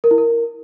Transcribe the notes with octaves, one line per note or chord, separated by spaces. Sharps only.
A#4
E4
A#4